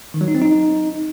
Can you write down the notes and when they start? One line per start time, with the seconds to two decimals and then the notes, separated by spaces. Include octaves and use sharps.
0.14 D#3
0.21 F#3
0.28 D#4
0.35 C4
0.42 D#4